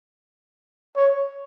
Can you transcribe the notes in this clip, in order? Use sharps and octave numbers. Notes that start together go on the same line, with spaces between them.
C#5